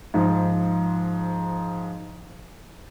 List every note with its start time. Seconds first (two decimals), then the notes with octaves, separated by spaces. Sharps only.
0.14 G#2 F3